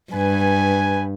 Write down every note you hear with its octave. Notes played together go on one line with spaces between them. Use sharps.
G2 B4 G#5